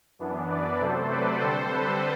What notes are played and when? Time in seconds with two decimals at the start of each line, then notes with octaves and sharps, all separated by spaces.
0.19 F#2 E3 B3 D4
0.49 B4 D5
0.79 C3 F#3 A3 A4 C5
1.11 B4 D5
1.41 D3 G3 C4 A4 C5
1.72 B4